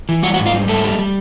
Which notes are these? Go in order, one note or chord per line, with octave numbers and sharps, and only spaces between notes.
E3
G3 F#4 F#5
F#4 F#5
G#2
F4 F5
G3
G#2 A3 A4
G3
G3